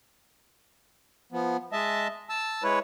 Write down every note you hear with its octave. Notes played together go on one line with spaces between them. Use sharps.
F3 B3
G#3 D#5 E5 A5
A5 E6
G#3 E4 B4 C#5